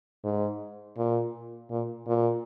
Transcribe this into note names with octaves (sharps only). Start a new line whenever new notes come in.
G#2
A#2
A#2
A#2